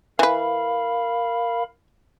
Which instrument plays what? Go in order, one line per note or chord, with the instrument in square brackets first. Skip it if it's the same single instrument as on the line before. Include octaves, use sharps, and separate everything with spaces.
[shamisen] E3 B4 [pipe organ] A#4 F5 B5